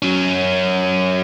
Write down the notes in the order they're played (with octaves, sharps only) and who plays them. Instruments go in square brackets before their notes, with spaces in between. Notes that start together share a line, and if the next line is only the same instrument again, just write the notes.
[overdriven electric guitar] F#3 C#4